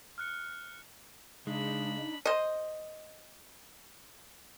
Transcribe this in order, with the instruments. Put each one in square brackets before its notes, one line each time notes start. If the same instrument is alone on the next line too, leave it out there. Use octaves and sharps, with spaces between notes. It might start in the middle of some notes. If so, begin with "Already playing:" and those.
[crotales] F6 F#6 C#7
[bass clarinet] C#3 [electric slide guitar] G#3 [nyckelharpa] D4 B5 [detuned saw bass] D#4
[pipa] C5 D#5